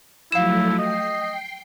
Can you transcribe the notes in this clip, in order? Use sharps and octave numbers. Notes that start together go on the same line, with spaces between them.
F3 F#3 A3 E4 F5 E7
D#5 G5 C7